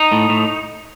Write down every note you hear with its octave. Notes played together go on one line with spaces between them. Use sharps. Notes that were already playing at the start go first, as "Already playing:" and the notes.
Already playing: D#4
A2
A2